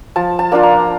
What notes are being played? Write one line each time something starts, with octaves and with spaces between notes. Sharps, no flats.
F3 A5
A5
A#3 D4 F4
A#5